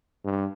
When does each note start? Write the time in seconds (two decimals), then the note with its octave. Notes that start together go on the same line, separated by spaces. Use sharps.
0.25 G2